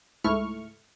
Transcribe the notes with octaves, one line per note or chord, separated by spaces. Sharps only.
C#2 G#2 A3 E4 C#6 F6